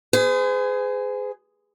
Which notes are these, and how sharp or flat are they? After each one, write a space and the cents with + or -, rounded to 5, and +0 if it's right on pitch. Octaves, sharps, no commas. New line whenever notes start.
G#4 +0 C5 -45